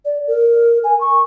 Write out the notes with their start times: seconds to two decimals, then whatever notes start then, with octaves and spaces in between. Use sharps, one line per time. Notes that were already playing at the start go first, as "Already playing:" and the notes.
0.05 D5
0.28 A#4
0.84 G#5
1.01 C#6